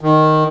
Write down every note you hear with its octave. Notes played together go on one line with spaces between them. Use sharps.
D#3